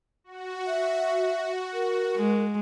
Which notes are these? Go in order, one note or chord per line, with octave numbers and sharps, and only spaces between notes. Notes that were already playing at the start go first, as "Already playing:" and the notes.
F#4
E5
A#4
G#3